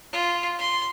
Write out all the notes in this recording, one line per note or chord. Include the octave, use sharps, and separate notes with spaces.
F4
C6